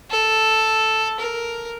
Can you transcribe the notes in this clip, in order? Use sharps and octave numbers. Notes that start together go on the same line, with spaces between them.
A4
A#4